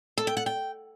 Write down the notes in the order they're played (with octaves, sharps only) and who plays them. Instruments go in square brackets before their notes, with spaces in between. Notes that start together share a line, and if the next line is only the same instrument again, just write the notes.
[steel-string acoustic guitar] A4
G5
F#5
G5